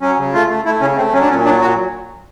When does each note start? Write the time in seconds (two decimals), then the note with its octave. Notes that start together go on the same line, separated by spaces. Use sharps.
0.01 F#3 C#4
0.18 C#3
0.33 A3 F4
0.49 A3
0.65 A3 E4
0.81 C#3 C#4
0.97 A3 C4
1.13 F#3 C#4
1.21 D4
1.29 A#2 C#4
1.45 F#3 D4
1.61 A#2 F#4